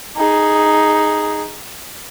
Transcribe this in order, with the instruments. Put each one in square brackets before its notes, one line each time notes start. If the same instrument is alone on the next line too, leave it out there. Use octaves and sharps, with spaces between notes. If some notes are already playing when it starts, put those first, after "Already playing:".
[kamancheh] D#4 G#4